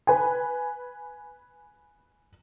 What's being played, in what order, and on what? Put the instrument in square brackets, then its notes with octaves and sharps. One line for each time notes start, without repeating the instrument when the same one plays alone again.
[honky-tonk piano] B4 G#5